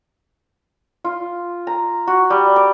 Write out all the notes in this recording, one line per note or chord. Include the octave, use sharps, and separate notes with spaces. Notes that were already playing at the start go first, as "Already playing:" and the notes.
F4
A#5
F#4
G3
D6